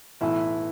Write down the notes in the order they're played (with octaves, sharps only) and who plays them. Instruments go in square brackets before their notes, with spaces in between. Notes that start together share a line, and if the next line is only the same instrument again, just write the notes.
[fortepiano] B1 A2 E3 E4